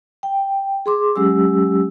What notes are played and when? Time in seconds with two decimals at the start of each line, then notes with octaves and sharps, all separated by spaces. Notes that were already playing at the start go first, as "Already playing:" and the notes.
0.23 G5
0.86 G#4 C6 D6
1.16 F#3 G#3 C#4 G4 E6